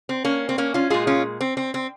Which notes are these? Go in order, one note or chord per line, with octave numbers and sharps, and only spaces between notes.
C4
A#3 C#4
C4
A#3 C#4
C#4 F4
A#2 G#3 F4 G#4
C#4 F4
C4
C4
C4